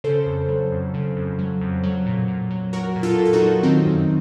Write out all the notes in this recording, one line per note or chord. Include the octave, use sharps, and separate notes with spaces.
C#3 A4 C5
F2
F#3
F2
C#3
F2
F#3
F2
F#3
A#2
A#2
F#3
F#3 F#4 A#4
A#2
F4 A4
A#2
A4
D#4 F#4
F#3
D#3 C4 D#4
F#2